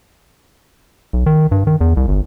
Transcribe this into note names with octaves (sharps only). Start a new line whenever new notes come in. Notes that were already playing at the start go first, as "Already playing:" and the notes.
B1
D#3
G2
D#3
E2
C2
G1